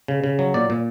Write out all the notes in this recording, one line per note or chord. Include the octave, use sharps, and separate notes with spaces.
C#3
C#3
F#3
A#2 D5
A#2